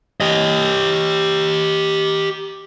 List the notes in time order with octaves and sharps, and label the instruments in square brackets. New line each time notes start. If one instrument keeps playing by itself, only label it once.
[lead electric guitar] G4 D#5